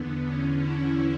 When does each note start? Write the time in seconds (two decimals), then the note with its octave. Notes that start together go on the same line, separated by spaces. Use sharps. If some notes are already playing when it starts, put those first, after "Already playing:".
Already playing: E2 D3 B3
0.24 E2 D3 C#4
0.58 E4